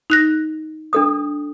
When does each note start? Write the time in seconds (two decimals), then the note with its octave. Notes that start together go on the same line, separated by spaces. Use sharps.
0.10 D#4 F#6 A#6
0.93 D4 A4 D#6